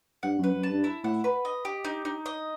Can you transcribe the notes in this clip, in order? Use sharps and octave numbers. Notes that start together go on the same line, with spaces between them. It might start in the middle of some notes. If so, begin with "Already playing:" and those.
G2 F#5
F#2 B4
F#2
A5
G2
E4
A2 F#5
B4
D#5
G4
D#4
D#4
D#5